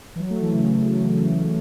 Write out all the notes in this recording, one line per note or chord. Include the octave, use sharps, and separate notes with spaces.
E3
F#3
A3
E3
C#3